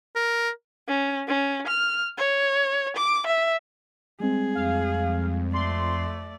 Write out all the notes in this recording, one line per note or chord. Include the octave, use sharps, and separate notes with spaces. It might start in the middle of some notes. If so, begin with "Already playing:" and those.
A#4
C#4
C#4
F6
C#5
D6
E5
G3 G#3 C4 G#4
F2 F5
A3 D5 C6